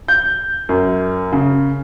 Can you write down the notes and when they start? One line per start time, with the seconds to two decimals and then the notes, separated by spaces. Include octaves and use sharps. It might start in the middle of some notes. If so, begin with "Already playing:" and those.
0.08 G6
0.69 F#2
1.32 C#3